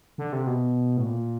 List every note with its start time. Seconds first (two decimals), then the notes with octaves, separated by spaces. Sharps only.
0.18 D3
0.33 C3
0.47 B2
0.97 A2
1.06 A#2